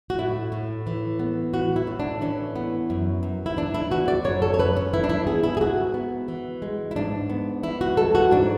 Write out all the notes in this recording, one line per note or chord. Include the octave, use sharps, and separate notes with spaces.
F#4
A2 E4
A2
E3
B3
A2 F#4
E4
A2
D4
E3 C#4
B3
F#2
F#2
E4
E3 D4
E4
B3 F#4
D5
F#2 C#5
A4
C#5
F#2 B4
C#4
E3 E4
D4
E4
B3 G#4
E4
G#4
G#2 F#4
B3
E3
G#3
E4
G#2 D4
B3
E3 E4
F#4
G#3 A4
F#4
G#2 D4